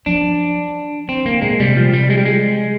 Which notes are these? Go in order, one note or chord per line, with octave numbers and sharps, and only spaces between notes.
F3 D4
D#3 C4
D3 A#3
A#2 G#3
C3 G3
F3
G3
G#3
G3
G#3